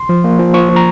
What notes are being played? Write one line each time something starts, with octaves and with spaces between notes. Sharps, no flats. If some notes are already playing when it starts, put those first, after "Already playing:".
Already playing: C6
F3
A#3
F3
F3 C#6
F3
A#5